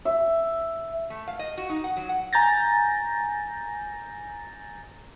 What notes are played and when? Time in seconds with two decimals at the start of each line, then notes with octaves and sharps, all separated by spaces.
0.05 E5
1.10 A3
1.28 F5
1.39 D#5
1.57 F#4
1.69 D#4
1.84 F#5
1.97 F#3
2.09 F#5
2.33 G#5 A#5 G6 A6 A#6